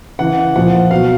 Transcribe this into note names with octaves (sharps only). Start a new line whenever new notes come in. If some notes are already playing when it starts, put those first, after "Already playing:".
C#3 E3 F#5
A#2 F3 F#5
B2 F#3 F5